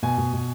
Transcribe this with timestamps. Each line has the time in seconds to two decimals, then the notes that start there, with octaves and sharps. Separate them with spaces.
0.03 B2 G#5
0.18 B2
0.33 B2